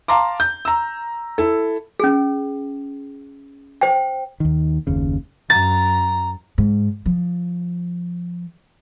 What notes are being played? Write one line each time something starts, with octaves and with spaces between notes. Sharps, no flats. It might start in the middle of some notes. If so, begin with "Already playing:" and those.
F5 A5 A#5 C6 D6
G6
A#5 E6
E4 A4
C#4 G#4
C5 G5
D#2 D#3
F#1 D#2 C#3
F#2 A#5 A6
G#2
F3